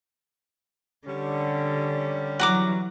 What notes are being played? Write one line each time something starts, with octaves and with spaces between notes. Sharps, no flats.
D3 G3 C#4
E3 F#3 F#4 A#5 D6